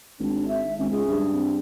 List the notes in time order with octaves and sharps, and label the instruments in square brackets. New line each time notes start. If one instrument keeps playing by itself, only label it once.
[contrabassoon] G#1 [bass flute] D4
[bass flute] E5
[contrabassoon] G#1 [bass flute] C#4
[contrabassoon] C#2 [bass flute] G#4
[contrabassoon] G2
[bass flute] C4